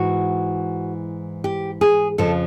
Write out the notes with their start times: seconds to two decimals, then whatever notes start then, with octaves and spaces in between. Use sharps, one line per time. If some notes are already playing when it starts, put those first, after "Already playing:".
Already playing: G#2 E3 F#4
1.44 G4
1.81 G#4
2.18 F2 C#3 F3 A4